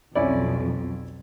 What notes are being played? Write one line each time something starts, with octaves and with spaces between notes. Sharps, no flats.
B1 F2 C#4 E4 D5